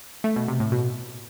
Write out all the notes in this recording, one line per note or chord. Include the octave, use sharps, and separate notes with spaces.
A3
B2
C3
A2
B2